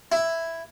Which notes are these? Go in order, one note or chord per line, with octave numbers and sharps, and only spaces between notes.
E4